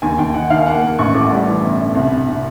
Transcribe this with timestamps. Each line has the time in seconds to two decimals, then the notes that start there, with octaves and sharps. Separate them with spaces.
0.02 D#2 G#5
0.18 D#2 G5
0.34 D#3 F#5
0.50 D#3 F5
0.66 A#3 F#5
0.82 A#3
0.99 A1 C#6
1.14 A2 D6
1.31 G3
1.47 E3
1.62 G1
1.79 G1
1.95 C2
2.11 C3
2.27 C3